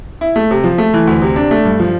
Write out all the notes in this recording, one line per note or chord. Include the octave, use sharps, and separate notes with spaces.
E4
A3
C3
F3
A3
E3
D2
C3
D4
A3
G2
F3